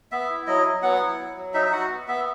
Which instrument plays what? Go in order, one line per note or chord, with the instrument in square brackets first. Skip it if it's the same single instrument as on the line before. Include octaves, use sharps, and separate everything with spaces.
[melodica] B3 E5
E4
F#3 D#5
F#3
B3 F#5
E4
F#3
F#3
D#4 E5
E5
F#4 F#5
B3
B3 E5